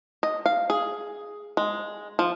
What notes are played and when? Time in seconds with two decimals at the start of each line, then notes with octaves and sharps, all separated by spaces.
0.23 D#5
0.46 F5
0.70 G#4
1.57 G#3
2.19 F3